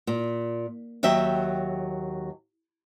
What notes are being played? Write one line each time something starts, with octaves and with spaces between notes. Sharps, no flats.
A#2
D#2 F#3 E5 G5